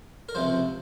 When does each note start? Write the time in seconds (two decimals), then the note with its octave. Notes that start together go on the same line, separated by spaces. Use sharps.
0.29 A#4
0.35 C#2 C3 F3 C5